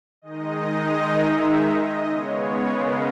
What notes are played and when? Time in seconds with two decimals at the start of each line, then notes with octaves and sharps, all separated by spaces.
0.22 D#3 G#3 D#4 D#5
1.15 E5
1.62 D#5
2.08 C#3 G#3 B3 C#5
2.39 C#5
2.71 A#4